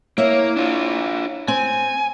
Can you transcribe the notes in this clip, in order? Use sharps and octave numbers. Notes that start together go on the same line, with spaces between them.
A#3 E4 C#5 E5
D4 F4
C4 G#5